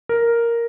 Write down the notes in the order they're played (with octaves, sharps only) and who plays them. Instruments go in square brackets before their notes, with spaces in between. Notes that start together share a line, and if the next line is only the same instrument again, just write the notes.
[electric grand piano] A#4